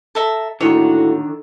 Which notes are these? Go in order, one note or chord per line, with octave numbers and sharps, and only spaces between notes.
A4 E5 A#5
A2 D3 D#3 A3 A#3 F#4 C#5